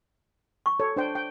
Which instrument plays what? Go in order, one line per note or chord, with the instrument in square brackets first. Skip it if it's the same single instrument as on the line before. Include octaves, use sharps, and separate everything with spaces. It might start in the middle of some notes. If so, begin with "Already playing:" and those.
[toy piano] C#6
[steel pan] A4 C#5
D4 C5 G5
G5